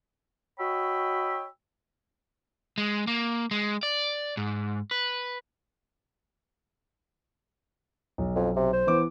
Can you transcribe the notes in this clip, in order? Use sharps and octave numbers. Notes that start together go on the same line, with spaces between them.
F#4 C#5 D#5 G5 B5 E6
G#3
A#3
G#3
D5
G#2
B4
B1
F2
C3
C5
E3 B3 D6